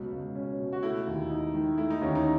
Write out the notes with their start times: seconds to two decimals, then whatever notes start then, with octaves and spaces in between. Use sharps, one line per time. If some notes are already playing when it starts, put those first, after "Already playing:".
Already playing: C#2 B2 F#3
0.12 C#2
0.35 C#4
0.59 B2
0.73 F#4
0.83 A3 E4
1.07 D#2
1.30 D#4
1.54 D#3
1.78 A3 E4
1.90 D#4
2.01 D#2 C#4
2.15 D#4